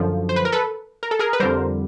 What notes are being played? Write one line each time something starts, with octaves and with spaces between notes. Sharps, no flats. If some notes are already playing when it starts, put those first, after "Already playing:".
Already playing: F#2 D3 F3
C5
B4
A#4
A4 B4
A#4
A4
G#4 A#4
B4
F2 D3 G3 A#4 C5